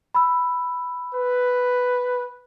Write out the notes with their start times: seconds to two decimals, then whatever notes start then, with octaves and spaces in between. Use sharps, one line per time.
0.15 B5 E6
1.14 B4